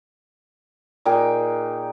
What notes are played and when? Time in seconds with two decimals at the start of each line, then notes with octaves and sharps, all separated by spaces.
1.06 A#2 D#4 G#4 G5